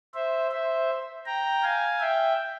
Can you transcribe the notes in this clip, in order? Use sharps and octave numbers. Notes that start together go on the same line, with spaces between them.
C5 E5
C5 E5
G5 A#5
F5 G#5
E5 G5